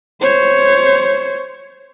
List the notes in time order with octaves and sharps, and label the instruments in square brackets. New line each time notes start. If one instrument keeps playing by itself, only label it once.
[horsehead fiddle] C5 C#5